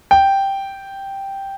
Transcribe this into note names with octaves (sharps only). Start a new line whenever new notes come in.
G5